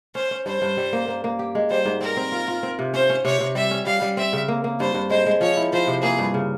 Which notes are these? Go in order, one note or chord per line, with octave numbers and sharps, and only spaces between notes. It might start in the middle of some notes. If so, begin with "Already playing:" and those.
C#4 C5
C#4
G2 C5
G2
G3
A#3
A#3
A#3
G4
G#3
G3 C5
G#2
C4 A#4
C4
F4
F4
C4
C3
C#4 C5
C#4
C3 C#5
C3
G3 E5
C#4
G3 F5
G3
C4 E5
C#3
A#3
A#3
G2 C5
G2
G#3 C5
G#3
F3 C#5
E4
F3 C5
C3
A#3 G#4
G2
C#3